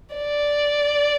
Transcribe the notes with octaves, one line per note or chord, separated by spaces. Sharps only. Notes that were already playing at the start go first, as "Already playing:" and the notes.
D5